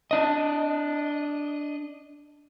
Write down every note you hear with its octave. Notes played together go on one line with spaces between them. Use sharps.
D4 D#5